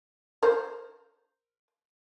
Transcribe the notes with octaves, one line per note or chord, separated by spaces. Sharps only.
A#4 C5